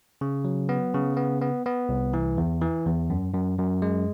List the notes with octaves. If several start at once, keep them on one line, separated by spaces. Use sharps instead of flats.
C#3
F#3
B3
C#3
B3
B3
B3
C2
E3
E2
E3
E2
F#2
F#2
F#2
G#3